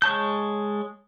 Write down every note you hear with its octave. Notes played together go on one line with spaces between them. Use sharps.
G#3 C#5 A5 G6